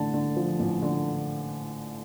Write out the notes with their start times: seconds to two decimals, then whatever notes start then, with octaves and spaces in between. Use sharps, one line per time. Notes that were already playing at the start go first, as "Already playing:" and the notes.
Already playing: A1 D3 A5
0.14 D3
0.36 F3
0.59 A1
0.82 D3